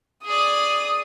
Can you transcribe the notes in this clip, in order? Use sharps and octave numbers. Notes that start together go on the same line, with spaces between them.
G#4 D5 D#6